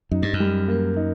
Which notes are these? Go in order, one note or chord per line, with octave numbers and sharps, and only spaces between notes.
F#2 D#4
G2
F#2
G3
A#3
D#4